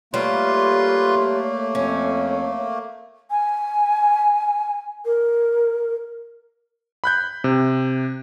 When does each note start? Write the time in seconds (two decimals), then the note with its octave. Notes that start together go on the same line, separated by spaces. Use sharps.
0.14 G3 A3 A#3 F4 B4 C#5 C6
1.75 F2 C#4
3.30 G#5
5.05 A#4
7.04 B5 F#6 G6
7.44 C3